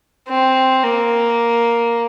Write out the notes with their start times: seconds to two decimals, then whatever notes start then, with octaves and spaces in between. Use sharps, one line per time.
0.28 C4
0.84 A#3